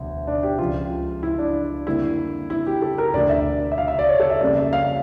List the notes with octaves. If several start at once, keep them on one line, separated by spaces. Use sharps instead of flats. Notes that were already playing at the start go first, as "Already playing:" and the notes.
Already playing: E1 D2
D4
G4
C#2 C#3 F3 F4
E4
D4
F2 D3 G3 A#3 E4
E4
G4
A4
A#4
E1 D2 D3 D5
E5
E5
F5
E5
D5
C#5
A4
E5
F2 C#3 G3 A#3 D5
E5
F5